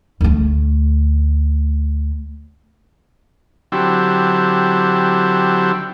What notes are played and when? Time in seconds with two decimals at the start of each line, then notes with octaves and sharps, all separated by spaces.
0.21 D2 A3
3.72 D3 F#3 C4 E4 G4